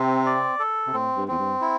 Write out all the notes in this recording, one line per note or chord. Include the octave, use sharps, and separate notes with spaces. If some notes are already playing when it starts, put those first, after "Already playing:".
Already playing: C3 C4
D5
A4
C3
A2 C4
G2
E2 C4
G2
E4